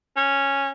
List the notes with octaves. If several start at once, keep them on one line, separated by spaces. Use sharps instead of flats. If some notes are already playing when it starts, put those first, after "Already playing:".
C#4